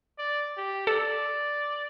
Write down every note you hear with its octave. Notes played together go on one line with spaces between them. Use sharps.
D5
G4
A4 D5